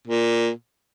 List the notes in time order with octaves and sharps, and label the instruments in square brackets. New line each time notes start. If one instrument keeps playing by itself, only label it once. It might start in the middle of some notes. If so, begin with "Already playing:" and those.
[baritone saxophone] A#2